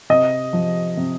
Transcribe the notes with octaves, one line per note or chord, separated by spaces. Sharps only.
C3 D#5
F3
C3